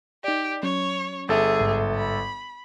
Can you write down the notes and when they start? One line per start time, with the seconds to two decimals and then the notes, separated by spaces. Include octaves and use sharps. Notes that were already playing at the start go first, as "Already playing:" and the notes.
0.24 D#4 G4 D5
0.63 F#3 C#4 C#5
1.29 G1 G#4 A4 E5
1.60 A1 G#2
1.96 B5